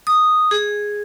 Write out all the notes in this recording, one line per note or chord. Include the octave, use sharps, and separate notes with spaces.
D#6
G#4